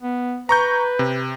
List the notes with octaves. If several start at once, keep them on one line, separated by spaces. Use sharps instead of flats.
B3
B4 A#5 C#6 G6
C3